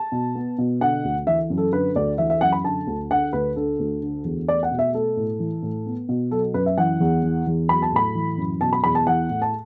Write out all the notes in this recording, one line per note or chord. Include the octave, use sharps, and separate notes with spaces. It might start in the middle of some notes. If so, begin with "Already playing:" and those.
Already playing: A5
B2
B3
B2
D3 F#5
D2
E3 E5
F#2
A4
D3 B4
D2 D5
E3 E5
E5
F#2 F#5
B5
D3 A5
D2
D3 F#5
D2 B4
D3 A4
D2
D3
E2
A3 D5
F#5
B2
E5
A3 A4
A2
E3
A2
B3
B2
F#3 A4
F#2 B4
E5
E3 F#5
E2
E3
E2
F#3 B5
A5
A2 B5
E3
F#2
B2 A5
B5
E2 B5
A5
E3 F#5
A2
A5